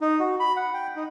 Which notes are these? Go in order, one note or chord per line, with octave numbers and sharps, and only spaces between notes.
D#4
F#4
B5
F#5
G5
D#4